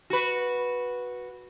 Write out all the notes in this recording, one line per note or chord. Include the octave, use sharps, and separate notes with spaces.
F#4 B4